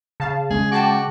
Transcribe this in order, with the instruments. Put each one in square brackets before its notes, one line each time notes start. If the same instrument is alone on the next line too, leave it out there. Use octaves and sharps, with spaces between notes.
[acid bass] C#3 [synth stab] F5 A5
[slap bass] G#3 C#4 [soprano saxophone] G#4
[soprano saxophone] F#4 [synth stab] G5 A5 D6